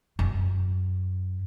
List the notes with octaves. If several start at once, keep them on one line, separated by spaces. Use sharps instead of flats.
F#2